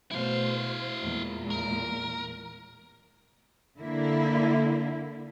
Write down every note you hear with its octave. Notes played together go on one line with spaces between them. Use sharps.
B2 A3 E4 C5 F5
E2 A#2 G#3
A#4
D3 A#3 E4